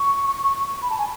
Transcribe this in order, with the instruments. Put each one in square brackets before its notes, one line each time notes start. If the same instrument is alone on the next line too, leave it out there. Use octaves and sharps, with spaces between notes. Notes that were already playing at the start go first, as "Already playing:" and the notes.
Already playing: [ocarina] C#6
B5
A5
G#5